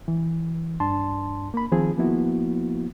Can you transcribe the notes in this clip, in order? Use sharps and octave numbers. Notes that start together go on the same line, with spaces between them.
E3
G2 D4 A5 C6
A#3 B5
D#3 F3 C4 G#4
F3 A#3 B3 E4 F#4